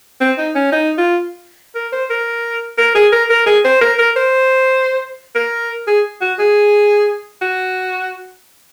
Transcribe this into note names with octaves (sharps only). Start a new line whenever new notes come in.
C4
D#4
C#4
D#4
F4
A#4
C5
A#4
A#4
G#4
A#4
A#4
G#4
C5
A#4
A#4
C5
A#4
G#4
F#4
G#4
F#4